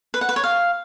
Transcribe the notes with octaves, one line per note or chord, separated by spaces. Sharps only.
B4
F#5
B4
C#5
F5